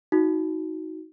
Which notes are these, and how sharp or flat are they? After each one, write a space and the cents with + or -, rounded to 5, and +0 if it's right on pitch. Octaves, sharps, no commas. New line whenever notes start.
D#4 +25 F#4 +0